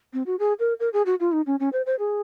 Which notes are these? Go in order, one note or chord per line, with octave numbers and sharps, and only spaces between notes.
C4
F#4
G#4
A#4
A#4
G#4
F#4
F4
D#4
C#4
C#4
C5
C5
G#4